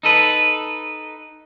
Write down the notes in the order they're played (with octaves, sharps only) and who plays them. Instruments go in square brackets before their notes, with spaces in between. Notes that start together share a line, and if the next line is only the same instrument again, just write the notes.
[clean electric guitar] D#4 A4 B4